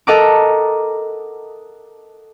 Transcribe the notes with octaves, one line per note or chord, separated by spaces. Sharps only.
A4 A#4 D#5 F#5 A#5 D6